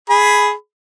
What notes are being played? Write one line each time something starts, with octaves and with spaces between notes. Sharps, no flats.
G#4 B5